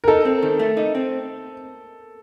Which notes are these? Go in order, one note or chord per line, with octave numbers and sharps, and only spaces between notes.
A#4
D#4 A4
C4
D#3
A3
D#4
C4